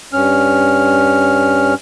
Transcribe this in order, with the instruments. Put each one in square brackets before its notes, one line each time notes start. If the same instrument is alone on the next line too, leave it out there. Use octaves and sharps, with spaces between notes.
[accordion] G2 C#4 F6